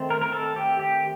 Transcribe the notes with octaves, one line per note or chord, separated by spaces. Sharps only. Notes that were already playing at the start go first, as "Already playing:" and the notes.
Already playing: D#3 A3 C4
A#4
A#4
A4
G4
G4